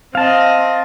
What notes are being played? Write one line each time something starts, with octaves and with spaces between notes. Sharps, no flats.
C4 D#5 F5 A5